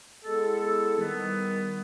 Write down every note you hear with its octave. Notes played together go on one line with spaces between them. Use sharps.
G#3 B3 E4 A4
D#3 G3 B3